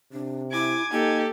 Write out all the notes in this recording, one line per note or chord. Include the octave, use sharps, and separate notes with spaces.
C3 D4
E4 G#5 D6 G#6
A#3 D#4 G4 A4